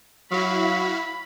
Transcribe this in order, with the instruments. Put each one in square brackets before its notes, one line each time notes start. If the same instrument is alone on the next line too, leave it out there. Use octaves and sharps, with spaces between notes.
[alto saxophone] F#3 [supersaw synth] E4 F#4 F5 [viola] B5